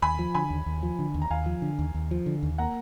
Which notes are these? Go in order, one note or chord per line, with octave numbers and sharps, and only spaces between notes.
D#2 G#5 B5
F3
D3 G#5 B5
D#2
D#2
F3
D3
D#2
A#5
D#2 F5 G#5
F3
D3
D#2
D#2
F3
D3
D#2
A#3 F#5 A#5